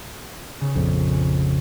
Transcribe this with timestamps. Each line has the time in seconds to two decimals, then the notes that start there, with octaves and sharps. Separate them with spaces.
0.61 C#3
0.75 A#1 F2 A#2